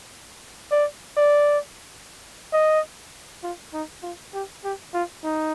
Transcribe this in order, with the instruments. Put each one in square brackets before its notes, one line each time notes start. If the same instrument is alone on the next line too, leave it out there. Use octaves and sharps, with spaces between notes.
[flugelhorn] D5
D5
D#5
F4
D#4
F4
G4
G4
F4
D#4